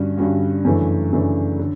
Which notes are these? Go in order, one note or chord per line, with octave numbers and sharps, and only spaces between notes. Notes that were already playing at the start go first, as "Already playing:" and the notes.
Already playing: G2 D3 G3 C#4 F#4
G2 D3 G3 C#4 F#4
F#2 C#3 E3 A3 D4
F#2 C#3 E3 A3 D4
D3